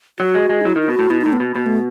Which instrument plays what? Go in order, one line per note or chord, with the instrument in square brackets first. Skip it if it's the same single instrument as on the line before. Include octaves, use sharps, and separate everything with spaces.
[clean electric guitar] F#3 [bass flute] F#4
[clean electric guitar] G#3
G#3
[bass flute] D#4
[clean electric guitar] F#3 [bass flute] E4
[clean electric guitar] D#3
[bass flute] E4
[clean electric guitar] B2 [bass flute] F#4
[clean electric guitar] A2
[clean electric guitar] B2 [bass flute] E4
[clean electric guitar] A2 [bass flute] D#4
[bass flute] B3
[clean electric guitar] B2
[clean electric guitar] B2 [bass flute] B3
[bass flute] A3